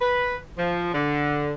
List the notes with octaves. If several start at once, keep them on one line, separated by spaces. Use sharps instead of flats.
B4
F3
D3